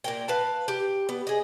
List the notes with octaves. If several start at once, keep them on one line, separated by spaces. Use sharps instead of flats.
A#2 A#4 G5
B4 F5 A5
G4
B3
G#4 D#5